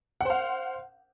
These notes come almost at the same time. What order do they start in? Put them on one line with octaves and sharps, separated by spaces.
F#5 C5 F5